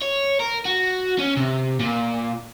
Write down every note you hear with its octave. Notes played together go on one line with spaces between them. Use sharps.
C#5
A#4
F#4
C#4
C3
A#2